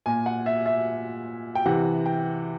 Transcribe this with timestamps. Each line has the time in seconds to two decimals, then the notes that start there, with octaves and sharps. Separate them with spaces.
0.06 A#2 G#5
0.26 F#5
0.46 E5
0.66 E5
1.55 G5
1.66 C3 E3 F#5
2.06 G5